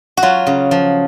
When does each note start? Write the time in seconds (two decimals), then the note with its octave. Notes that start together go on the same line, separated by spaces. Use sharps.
0.17 F#4
0.22 F#3 F4
0.47 C#3
0.71 F3